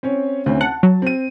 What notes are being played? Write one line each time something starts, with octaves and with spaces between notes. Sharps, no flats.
C4 C#4 C#5
D2 C4 C#4
F#5 A5
F#3
C4 D#7